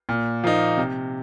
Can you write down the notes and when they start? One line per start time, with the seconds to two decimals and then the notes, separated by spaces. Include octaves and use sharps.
0.09 A#2
0.44 F3 A#3 D#4
0.77 C3